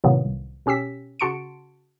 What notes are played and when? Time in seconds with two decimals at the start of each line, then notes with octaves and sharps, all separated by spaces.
0.04 A2 C3 D#3 F#3 A#3 B3
0.25 C2
0.66 B2 C#4 G4 E6 B6
1.20 C#3 F#4 A5 C6 C#7 D7